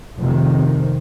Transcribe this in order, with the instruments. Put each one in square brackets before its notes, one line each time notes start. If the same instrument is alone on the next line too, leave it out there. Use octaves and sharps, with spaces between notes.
[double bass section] F1 F2 C3 D#3